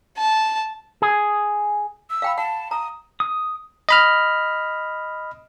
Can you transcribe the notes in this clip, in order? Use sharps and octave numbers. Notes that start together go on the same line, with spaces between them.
A5
G#4
E6
F5 G5 B5
F#5 A5
A#5 D#6
D#6
D#5 B5 F6